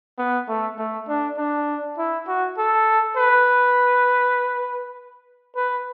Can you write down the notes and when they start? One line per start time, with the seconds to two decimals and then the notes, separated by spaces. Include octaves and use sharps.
0.18 B3
0.48 A3
0.78 A3
1.08 D4
1.38 D4
1.98 E4
2.28 F#4
2.58 A4
3.17 B4
5.56 B4